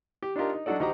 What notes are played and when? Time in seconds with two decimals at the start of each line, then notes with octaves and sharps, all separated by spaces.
0.23 G4
0.36 D4 D#4 F4 G4 A#4
0.53 D#4
0.66 F#3 D4 D#4 F#4 A4 D5
0.80 D2 D#4 F#4 G4 C5 A#5